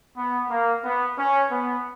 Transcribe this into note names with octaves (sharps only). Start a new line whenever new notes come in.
B3
A#3
B3
C#4
B3